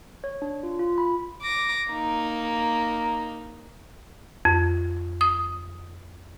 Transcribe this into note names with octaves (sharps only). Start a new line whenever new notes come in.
C#5
D4
F4
F4
B5
D6 A#6
A#3 D#4
F2
D#6